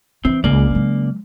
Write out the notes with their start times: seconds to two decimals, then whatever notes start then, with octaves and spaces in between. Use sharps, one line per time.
0.25 E3 C4
0.44 C#2 C#3 A#3 D5
0.70 F#3 G#3